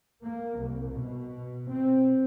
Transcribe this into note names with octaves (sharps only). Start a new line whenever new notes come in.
A#3
C2
B2
C4